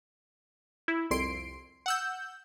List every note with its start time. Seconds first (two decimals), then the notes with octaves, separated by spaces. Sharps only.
0.88 E4
1.11 C2 F2 C6 C7 D7
1.86 F#5 E6 G6